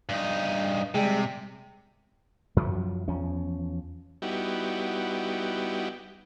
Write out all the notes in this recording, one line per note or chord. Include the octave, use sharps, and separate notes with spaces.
G2 D#4
C3 G3 G#3
F#2 F3 F#3
E2 F3 C#4
G3 B3 D#4 E4 F#4 G4